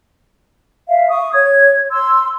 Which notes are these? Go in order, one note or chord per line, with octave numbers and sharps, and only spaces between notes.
E5 F5
C#6 D#6
C#5 G#6
C6 E6